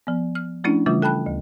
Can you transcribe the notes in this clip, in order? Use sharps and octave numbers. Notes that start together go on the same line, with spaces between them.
F3 B3
F6
F3 A3 C#4 D4 E4
C#3 E3 G3 A3 F4
A4 G5 A5 B5 F#6
D2